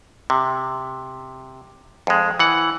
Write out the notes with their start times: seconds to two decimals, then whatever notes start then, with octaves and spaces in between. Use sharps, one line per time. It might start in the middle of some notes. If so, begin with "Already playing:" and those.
0.30 C3
2.07 F2 G#3
2.39 E3 F#5